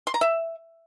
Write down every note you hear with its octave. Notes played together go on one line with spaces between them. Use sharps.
C6
A#5
E5